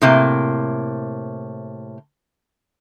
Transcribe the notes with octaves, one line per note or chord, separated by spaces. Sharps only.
A2 C3 A#3